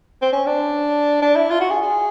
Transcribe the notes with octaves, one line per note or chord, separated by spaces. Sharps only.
C4
C#4
D4
D4
E4
F4
F#4
G#4
G#4